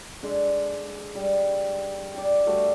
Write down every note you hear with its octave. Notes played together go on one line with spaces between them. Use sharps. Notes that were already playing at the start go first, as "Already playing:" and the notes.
G#3 D4 A4
G3
G4 D5
G3 A3 F#4